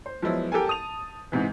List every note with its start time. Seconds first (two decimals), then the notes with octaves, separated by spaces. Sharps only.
0.06 C5
0.22 F3 F#3 G#3 B3 E4
0.52 G4 A4 A#4 G#5
0.67 A5 D#6 F7
1.32 G#2 C3 E3